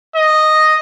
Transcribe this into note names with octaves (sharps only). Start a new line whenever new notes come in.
D#5